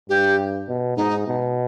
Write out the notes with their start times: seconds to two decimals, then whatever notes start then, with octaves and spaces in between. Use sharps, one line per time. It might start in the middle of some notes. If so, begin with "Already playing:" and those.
0.09 G2 G4
0.68 B2
0.97 G#2 D#4
1.27 B2